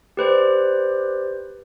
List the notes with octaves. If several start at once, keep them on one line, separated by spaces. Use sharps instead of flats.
G4 B4 C5 D5